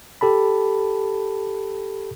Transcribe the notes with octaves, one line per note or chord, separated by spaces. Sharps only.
G4 A4 A5 B5